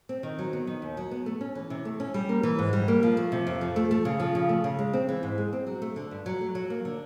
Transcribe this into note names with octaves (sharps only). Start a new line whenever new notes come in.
C4
D#3
F#3
B3
D#3
D#2
F#3
B3
A3
C#4
E3
C3
A3
C#4
G3
A#3
E3
G#2
G3
A#3
F3
A3
C3
F2
F3
A3
A3
C#3
F3
C#3
A3
C#3
G#3
C4
E3
G#2
G#3
C4
F#3
A3
D3
G2
F#3
A3
F#3
A#3
D3